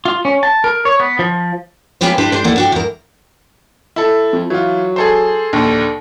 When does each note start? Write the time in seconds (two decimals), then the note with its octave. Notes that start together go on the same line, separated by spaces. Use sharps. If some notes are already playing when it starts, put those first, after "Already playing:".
0.05 F4
0.25 C#4
0.43 A5
0.64 A#4
0.85 C#5
1.00 B3
1.19 F3
2.01 A#3 B3 C#4 G4 B4 C5
2.18 D4 E4 G4 B4 C5
2.32 D4 G4 C5
2.44 D#2 E3 A#3 A4 D5 F#5
2.56 D4 F#4 G4
2.72 E2 A#4
3.96 E4 A4
4.33 F2
4.50 E3 F#3 F4
4.96 G#4 A4 C5
5.53 A#1 D#2 D3